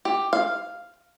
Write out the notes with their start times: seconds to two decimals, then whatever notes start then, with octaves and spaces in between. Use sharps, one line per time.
0.05 G4
0.33 F5